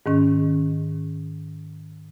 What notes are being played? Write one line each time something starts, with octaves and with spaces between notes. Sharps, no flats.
G#2 D#3 C#4